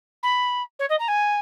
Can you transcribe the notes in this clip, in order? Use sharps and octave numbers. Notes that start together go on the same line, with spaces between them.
B5
C#5
D#5
A#5
G#5